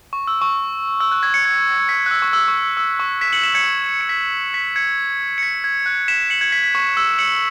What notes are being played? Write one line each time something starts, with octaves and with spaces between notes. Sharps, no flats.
C#6
E6
C#6
E6
F#6
G#6
G#6 C#7
G#6 C#7
B6
G#6
F#6
E6
C#6
E6
C#6
E6
E6
C#6
B6 E7
C#7 F#7
B6 E7
G#6 C#7
C#7
B6
B6
G#6 C#7
C#7
B6
G#6
F#6
B6 E7
C#7 F#7
G#6 C#7
B6
B6
C#6
E6
C#7 F#7